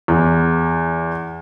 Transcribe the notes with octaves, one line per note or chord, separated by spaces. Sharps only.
E2